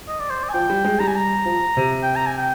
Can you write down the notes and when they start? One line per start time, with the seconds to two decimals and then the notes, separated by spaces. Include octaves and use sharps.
0.08 D#5
0.20 D5
0.30 C5
0.43 D5
0.49 G#5
0.53 F3 G5
0.70 G3
0.85 G#3
0.99 G3 A#5
1.08 G#5
1.16 A#5
1.45 F3
1.77 C3
2.03 G5
2.16 A#5
2.26 G#5
2.38 G5